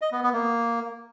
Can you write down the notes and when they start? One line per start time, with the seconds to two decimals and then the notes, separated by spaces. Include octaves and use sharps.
0.02 D#5
0.12 B3
0.23 B3
0.33 A#3